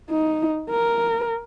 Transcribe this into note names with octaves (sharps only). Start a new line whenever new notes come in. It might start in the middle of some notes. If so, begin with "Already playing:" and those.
D#4
A#4